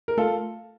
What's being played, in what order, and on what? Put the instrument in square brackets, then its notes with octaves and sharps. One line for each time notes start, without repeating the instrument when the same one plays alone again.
[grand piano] A#4
[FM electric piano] A3 [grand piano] F4 A4